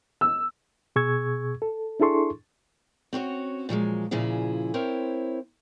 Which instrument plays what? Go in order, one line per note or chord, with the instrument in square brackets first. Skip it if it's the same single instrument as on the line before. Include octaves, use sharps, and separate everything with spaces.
[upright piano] E6
[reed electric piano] B2 G#4 C#6 E6 G#6
A4
D4 E4 G#4 A4 C6 C#6
[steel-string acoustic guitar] C4 C#4 F#4 C#5
A#2 F3 F#3 G#3
A#2 C#3 F3 E4 G#4
C4 E4 A#4 C5 C#5